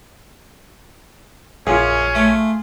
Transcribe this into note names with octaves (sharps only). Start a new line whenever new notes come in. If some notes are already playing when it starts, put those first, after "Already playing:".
A#1 F#2 C#4 F4 G#4
A3